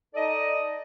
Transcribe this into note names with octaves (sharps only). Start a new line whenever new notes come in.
D#4 A4 D5 D#5